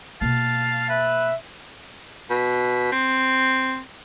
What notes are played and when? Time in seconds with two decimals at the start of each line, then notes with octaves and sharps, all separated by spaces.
0.21 B2 A#3 F5 A5
0.89 B4 E5
2.30 B2
2.92 C4